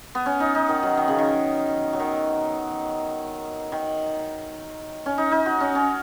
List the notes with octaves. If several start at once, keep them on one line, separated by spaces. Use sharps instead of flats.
B3
C#4
D#4
D#4
D#3
F#3
D#3
C#3
D#3
F#3
D#3
D#3
C#4
D#4
D#4
F#4
C#4
C#4